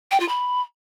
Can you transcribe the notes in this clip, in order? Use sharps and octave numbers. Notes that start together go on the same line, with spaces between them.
G5
F4
B5